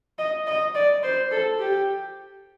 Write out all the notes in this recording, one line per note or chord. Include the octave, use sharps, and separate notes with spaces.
D#5
D#5
D5
C5
A4
G4